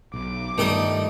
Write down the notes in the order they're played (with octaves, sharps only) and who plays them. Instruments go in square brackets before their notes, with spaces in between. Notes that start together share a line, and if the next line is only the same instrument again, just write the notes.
[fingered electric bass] B1 [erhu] D6
[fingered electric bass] G2 B3 [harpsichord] D#3 G5 D#6 [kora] G3 A3